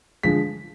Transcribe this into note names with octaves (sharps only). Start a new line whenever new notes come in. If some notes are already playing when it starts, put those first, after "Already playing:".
D3 F3 G#3 B6